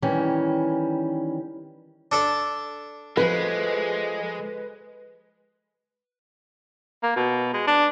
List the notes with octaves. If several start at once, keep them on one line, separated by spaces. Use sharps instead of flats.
D#3 E3 G3 C#4
D4 A4 D5
F3 G#3 A3 B4
A#3
B2
G#3
D4